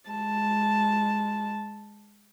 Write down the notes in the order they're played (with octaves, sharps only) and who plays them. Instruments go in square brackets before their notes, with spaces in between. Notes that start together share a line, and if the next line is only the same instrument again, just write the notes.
[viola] G#3 A5